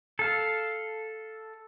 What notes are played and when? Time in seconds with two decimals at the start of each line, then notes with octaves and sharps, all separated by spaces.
0.19 A4 F5